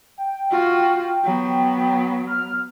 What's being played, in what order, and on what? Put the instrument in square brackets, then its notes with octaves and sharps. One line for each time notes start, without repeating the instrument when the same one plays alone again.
[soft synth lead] G5
[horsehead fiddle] F4 F#4
F#3 B3
[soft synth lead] F6